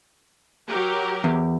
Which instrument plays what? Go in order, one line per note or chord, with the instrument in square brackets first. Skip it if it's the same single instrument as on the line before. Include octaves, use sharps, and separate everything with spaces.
[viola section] F#3 G4 A#4
[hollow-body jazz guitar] E2